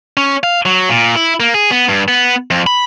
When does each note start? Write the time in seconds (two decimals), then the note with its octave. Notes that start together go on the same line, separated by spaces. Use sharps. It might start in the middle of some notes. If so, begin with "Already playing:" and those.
0.17 C#4
0.43 F5
0.65 F#3
0.89 A#2
1.15 E4
1.40 A#3
1.54 G#4
1.71 B3
1.89 G2
2.08 B3
2.51 F2
2.67 B5